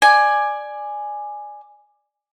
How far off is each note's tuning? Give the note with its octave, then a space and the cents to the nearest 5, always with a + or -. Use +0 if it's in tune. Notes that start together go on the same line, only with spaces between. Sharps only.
D5 +15 G#5 +0